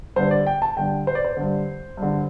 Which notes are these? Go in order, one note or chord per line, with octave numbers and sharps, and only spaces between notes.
G2 D3 C5
D5
G5
A5
G2 D3 G5
C5
D5
C5
G2 D3
G2 D3